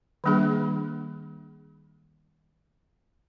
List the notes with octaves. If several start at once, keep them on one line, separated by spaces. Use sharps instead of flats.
D#3 G3 A#3 D4 G#4